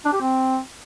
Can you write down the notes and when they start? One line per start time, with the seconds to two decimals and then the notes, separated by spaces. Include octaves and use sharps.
0.05 D4
0.13 G4
0.20 C4